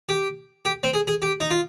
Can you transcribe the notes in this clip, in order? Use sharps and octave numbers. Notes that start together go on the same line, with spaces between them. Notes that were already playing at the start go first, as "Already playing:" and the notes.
G4
G4
C4
G#4
G#4
G4
D#4
F4